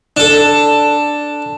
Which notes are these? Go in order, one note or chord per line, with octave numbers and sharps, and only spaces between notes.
D4 A4